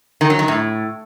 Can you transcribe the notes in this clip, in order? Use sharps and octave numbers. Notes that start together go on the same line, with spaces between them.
D#3
F#3
D#3
A2